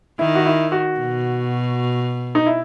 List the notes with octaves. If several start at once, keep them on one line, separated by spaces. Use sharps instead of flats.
D#3 E4
F#4
E4
F#4
B2
D#4
E4